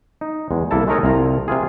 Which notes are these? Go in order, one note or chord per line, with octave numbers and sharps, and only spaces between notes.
D#4
E2 G#3
C2 A#3 E4 A4 A5
G#3 A3 D#4 A#4 C#5 D#5
C2 C3 F4 A#5
C3 E4 F4 G#4